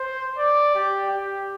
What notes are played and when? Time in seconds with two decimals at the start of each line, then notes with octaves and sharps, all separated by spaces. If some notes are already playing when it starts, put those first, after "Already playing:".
Already playing: C5
0.38 D5
0.75 G4
1.11 G4